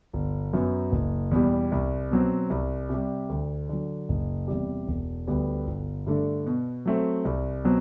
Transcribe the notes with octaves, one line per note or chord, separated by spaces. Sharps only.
G1
F#2 F#3 B3
F#1
E2 B2 G3
C2
B2 F#3 C4
C2
C3 G3
D2
D3 F#3
F#1
E2 C3 G3
E1
D2 D3 G3 B3
G1
G2 D3 A3 D4
B2
F#3 A3 C4
C2
B2 F#3 C4